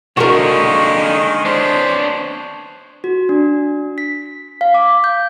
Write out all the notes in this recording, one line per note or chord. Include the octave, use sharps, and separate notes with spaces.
D3 D#3 G#3 A#3 F#4 A#4 C#6
B3 D4 C5 C#5
F#4
D4
B6
F5
D6
G6